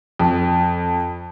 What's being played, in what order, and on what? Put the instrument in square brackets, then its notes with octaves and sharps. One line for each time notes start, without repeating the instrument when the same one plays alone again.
[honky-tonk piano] F2